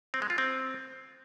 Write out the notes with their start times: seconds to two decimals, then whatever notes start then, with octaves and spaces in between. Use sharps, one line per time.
0.14 C4
0.22 G#3
0.30 F4
0.38 C4